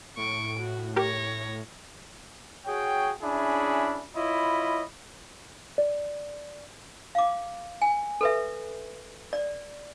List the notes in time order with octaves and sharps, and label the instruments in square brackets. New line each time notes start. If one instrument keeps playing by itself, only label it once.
[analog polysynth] A2 [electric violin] C#6 D7
[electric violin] F#4
[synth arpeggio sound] G4 A#4 [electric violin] C#5 A#6
[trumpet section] F#4 G#4 C#5 G5
C#4 D4 E4 G#4 E5 B5
E4 F4 C#5 D#5 B5
[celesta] D5
[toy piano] F5 D6
G#5
A4 B4 E5
D5